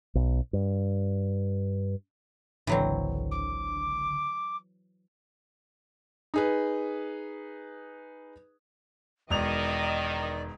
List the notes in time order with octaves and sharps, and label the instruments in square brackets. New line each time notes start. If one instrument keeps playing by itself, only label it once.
[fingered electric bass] B1
G2
[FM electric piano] G#1 C#2 D3 [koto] E3 F#3 C4
[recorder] D6
[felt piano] D#4 G#4 B4
[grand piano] E1 F7 [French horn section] D#3 [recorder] D5 [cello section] D#5